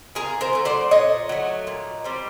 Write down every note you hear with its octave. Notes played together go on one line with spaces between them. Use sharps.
A#2 G#4 A#4
A#4 C5
F#3 A3
C5 D5
A#2 C#5 D#5
F#3 A3
A#2
G3 C4